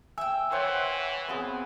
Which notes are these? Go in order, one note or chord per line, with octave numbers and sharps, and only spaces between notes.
E5 G5 G#5 E6
E3 C5 C#5 F#5
B3 C4 G#4